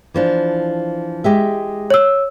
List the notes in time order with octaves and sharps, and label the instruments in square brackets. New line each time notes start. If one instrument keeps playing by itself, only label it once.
[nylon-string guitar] E3 F3 D4
G#3 G4 E5
[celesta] C#5 E6